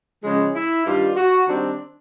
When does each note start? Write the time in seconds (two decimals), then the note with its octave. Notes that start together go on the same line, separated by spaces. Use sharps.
0.23 C#3 F3 G#3
0.54 E4
0.85 G2 D#3 G3 F4
1.16 F#4
1.47 D#3 G3 C4 D4